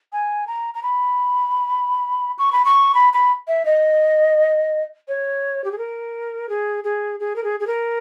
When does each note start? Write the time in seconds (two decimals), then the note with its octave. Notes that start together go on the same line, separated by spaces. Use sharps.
0.13 G#5
0.47 A#5
0.75 A#5
0.83 B5
2.39 C#6
2.52 B5
2.65 C#6
2.95 B5
3.13 B5
3.48 E5
3.65 D#5
5.08 C#5
5.64 G4
5.72 G#4
5.78 A#4
6.49 G#4
6.84 G#4
7.20 G#4
7.36 A#4
7.44 G#4
7.60 G#4
7.67 A#4